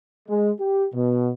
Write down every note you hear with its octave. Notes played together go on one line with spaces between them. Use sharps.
G#3
G4
B2